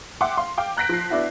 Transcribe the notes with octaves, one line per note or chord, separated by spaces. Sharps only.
E5 F#5 G5 C6 D6
F5 C6
F5 G5 D6
A#5 F#6 G6 A#6 B6 D7
F3 C7
B3 D4 E4 F#4